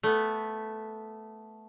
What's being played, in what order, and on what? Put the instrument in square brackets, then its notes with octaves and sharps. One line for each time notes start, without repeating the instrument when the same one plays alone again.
[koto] A3 B3